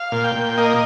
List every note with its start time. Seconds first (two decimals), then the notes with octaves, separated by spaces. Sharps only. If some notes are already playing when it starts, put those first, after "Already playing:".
Already playing: F5
0.12 A#2
0.24 G5
0.35 A#2
0.57 A#3 D#5